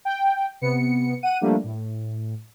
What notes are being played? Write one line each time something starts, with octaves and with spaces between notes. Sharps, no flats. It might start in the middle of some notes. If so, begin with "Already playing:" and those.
G5
C3 B3 C#7
F#5 D#7
F3 G3 A3 A#3 D4
A2